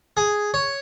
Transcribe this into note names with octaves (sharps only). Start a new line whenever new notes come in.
G#4
C#5